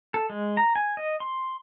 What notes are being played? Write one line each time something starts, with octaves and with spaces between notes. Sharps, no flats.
A4
G#3
A#5
G#5
D#5
C6